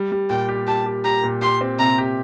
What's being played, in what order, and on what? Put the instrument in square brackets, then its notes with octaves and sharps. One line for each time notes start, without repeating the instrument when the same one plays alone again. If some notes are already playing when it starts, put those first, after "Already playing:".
Already playing: [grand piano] G3
G3
[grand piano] A#2 [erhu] G5
[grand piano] G4
[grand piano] G4 [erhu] A5
[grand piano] G4
[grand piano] G4 [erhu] A#5
[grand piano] A#2
[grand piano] G4 [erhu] C6
[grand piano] C4
[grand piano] C3 [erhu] A#5
[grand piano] G4